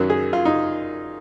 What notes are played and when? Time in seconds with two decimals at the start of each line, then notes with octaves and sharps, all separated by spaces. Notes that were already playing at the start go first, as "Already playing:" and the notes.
Already playing: F#2 D#3 F#3
0.10 G#4
0.33 F4
0.45 D#4